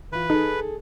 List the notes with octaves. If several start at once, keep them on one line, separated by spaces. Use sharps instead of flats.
E3 F4 B4
D#4 G#4 A4